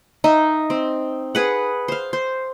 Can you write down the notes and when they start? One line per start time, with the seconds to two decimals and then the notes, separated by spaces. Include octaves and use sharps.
0.24 D#4 D#5 E5
0.70 C4
1.35 G#4 B4 F#5
1.88 C5 F5
2.13 C5